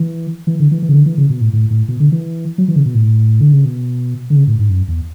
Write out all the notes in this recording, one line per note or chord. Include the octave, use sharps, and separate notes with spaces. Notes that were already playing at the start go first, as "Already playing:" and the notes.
Already playing: E3
E3
D3
E3
E3
C#3
D3
E3
C#3
B2
A2
A2
A2
B2
D3
E3
F#3
E3
C#3
B2
A2
D3
C#3
B2
D3
C#3
A2
G#2
F#2
E2